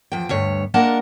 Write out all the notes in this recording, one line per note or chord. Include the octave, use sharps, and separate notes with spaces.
E2 F3 G5
D2 G2 C#5
G#3 A#3 D4 A#4 F#5 A5